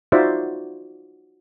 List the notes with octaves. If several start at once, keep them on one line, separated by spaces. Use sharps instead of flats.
D#4 F4 F#4 C5 D5 E5